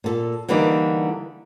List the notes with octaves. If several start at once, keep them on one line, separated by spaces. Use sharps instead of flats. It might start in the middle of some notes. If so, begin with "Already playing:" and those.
A#2 A4
D3 E3 G3 A#3 D4 D#4